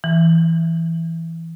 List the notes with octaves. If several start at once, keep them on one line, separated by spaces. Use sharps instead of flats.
E3